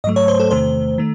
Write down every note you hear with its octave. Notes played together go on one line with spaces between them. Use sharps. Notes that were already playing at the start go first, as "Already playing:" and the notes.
G#2 F#3 A3 D#5
C#5
C5
A4
E2 C3 D#3 A3 C5
D#3 A3